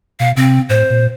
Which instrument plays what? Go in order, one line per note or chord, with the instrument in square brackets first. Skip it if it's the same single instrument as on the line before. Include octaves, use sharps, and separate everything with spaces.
[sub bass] B2 [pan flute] F5
[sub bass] C3 [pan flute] C4
[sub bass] A2 [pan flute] C5
[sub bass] A#2